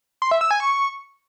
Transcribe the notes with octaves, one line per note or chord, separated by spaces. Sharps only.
C6
E5
E6
G#5
C#6